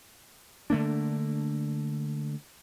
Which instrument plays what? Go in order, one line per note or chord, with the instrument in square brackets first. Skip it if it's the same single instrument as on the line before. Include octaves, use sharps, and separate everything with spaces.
[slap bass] D3 A3 A#3 D4